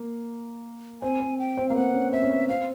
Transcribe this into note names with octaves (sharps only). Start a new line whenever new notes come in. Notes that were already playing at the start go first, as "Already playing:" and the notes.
Already playing: A#3
C4 G#5
C4
G5
C4
A#3 F5
B3 F#5
C#4
C4 E5
C#4
C4
C4 F5